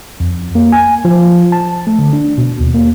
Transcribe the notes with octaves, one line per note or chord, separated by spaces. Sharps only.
F2
A#3
G#5
F3
A5
A3
D3
D4
B2
D#2
A#3